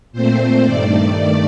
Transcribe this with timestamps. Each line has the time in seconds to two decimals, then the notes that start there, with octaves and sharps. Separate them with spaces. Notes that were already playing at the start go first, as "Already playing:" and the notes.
0.12 A#2 A3 C4 C5
0.62 G2 D#3 A3 D5